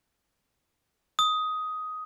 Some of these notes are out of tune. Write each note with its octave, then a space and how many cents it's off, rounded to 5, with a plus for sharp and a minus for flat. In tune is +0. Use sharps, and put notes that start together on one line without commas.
D#6 +10